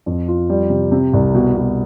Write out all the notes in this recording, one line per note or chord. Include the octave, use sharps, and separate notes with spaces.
F2
F4
G3
C3
C3
C2
B2
B2